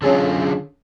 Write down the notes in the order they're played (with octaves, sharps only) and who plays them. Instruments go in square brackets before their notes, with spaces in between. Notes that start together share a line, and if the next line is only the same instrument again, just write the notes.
[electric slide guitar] D3 F#3 F4 [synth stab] C#4 G#4 A4